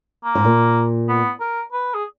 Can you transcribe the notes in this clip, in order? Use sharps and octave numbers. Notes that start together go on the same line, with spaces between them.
A#3
G#2
A#2
B3
A#4
B4
G#4